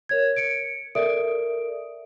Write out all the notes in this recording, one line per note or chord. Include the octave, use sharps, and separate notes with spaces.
A#4 C#5 G#6
C#7 D7
A4 A#4 D5 E5 D#6 D7